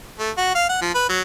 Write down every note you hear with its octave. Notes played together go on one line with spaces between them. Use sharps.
A3
F#4
F5
F#5
F3
B4
F#3